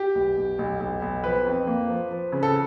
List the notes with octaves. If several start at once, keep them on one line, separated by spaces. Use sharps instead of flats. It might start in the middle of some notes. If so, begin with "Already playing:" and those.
Already playing: G4
B1
B1
B1
B1
B1
F3 B4
F2
A#3
F3
F3
C#3
A4